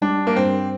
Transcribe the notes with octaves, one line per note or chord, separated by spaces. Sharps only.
G3 D4
A#3
G2 C4